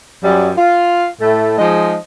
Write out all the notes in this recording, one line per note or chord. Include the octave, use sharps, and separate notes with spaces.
F#2 G3
F4
A2 A3
F3 G#3 D#4 D#5